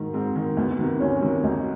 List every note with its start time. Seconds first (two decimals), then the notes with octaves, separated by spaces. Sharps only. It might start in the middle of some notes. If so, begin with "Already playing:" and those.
Already playing: G#2 D#3
0.14 G#2 C4
0.36 D#3
0.57 D2 B3
0.79 C3 D#3
1.00 D2 C#4
1.22 C3 D#3
1.43 D2 D#4